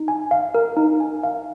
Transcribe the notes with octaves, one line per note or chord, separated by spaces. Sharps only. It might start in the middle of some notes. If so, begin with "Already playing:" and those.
Already playing: D#4
G#5
F5
A#4
D#4
G#5
F5